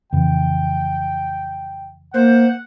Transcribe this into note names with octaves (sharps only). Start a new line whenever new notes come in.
F2 C#3 E3 G5
A#3 C5 F#5